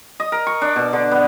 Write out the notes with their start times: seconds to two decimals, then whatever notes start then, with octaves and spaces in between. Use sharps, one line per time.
0.20 D#5
0.32 A#4
0.47 C#6
0.62 D4
0.76 B2
0.93 D3
1.11 B3